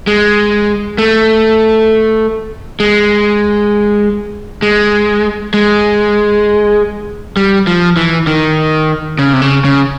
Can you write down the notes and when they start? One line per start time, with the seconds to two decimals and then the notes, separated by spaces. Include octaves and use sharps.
0.07 G#3
0.98 A3
2.80 G#3
4.62 G#3
5.54 G#3
7.37 G3
7.67 F3
7.97 E3
8.27 D#3
9.19 C#3
9.33 C3
9.42 C#3
9.65 C#3